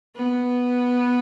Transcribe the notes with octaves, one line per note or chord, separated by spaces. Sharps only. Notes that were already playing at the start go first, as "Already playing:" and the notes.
B3